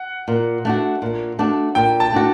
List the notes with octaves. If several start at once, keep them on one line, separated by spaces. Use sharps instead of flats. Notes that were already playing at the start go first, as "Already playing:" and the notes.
Already playing: F#5
A#2
A3 D4 F#4
A#2
A3 D4 F#4
A#2 G5
A5
A3 D4 F#4